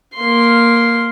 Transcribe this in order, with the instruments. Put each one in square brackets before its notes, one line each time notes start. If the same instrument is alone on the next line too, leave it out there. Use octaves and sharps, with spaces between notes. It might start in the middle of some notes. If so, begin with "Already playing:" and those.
[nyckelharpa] A#3 C6